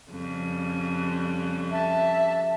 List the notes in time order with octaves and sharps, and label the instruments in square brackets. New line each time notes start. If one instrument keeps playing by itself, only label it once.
[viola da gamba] F2 C#3 G3
[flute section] E5 A5